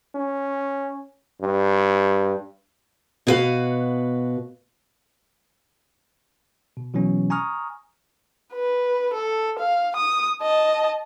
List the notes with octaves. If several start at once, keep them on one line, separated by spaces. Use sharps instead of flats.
C#4
G2
B2 E4 F#4 B4 F5
B2
B2 E3 F#3 C#4
G#5 A#5 C#6 D#6 F6
B4
A4
F5
D#6
D#5 A5